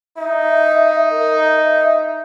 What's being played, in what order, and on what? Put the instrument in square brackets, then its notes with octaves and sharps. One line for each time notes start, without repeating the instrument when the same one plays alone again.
[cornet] D#4 [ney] E5
[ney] A#4
E5